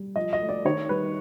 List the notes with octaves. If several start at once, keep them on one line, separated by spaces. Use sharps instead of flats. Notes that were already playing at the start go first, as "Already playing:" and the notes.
Already playing: G3
F3 D#5
D#5
A3
D5
D#3 C#5
G3 B4